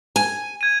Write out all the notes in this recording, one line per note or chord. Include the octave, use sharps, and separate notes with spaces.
G#5
G#6 D#7